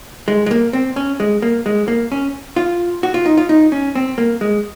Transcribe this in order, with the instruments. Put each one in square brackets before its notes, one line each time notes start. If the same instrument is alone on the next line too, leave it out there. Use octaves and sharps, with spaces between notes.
[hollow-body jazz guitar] G#3
G#3
A#3
C4
C#4
G#3
A#3
G#3
A#3
C#4
F4
F#4
F4
D#4
F4
D#4
C#4
C4
A#3
G#3